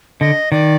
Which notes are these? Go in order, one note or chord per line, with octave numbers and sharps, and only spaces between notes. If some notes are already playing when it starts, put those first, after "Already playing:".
D3 D#5
D#3 D5